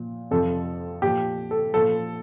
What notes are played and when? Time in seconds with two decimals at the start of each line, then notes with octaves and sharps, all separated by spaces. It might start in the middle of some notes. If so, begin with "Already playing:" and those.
Already playing: A#2 F3
0.31 F2 C3 F3 A4
1.02 A#2 F3 G4
1.51 A4
1.74 A#2 F3 A4